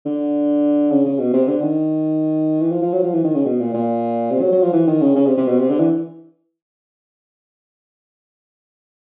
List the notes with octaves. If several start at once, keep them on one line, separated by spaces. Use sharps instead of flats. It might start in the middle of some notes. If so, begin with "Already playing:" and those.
D3
C#3
C#3
B2
C3
D3
D#3
E3
F3
F3
F#3
F3
E3
D#3
C#3
B2
A#2
A#2
C3
F#3
F#3
F3
E3
D#3
C#3
C#3
C3
C3
B2
C3
D3
E3